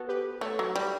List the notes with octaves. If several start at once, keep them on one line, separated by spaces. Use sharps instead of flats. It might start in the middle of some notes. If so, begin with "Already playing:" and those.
Already playing: B3 F#4 A4
G4 B4
A3 A4 C#5
F#3
G3